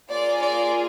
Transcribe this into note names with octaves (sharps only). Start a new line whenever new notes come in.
A#3 F4 G#4 D5
D5